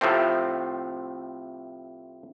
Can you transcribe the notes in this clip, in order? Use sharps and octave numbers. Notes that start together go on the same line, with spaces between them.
A2 C3 F3 A3 C4